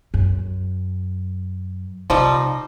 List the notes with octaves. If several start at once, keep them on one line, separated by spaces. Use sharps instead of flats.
F#2
C3 F3 G3 D#4